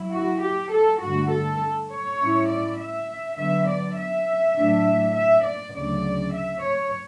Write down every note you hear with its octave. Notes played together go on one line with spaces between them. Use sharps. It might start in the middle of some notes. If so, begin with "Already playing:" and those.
Already playing: F#3 E4
F#4
G4
A4
G2 D3 A3 F#4
A4
C#5
A2 G3 C#4 E4
D5
E5
D3 F#3 B3 E5
D5
E5
A2 F#3 A3 D4
E5
D5
D2 C#3 F#3 D5
E5
C#5